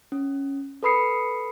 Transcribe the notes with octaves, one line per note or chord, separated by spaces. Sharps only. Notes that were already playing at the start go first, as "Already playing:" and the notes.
C#4
A4 B4 B5 D#6 C7 C#7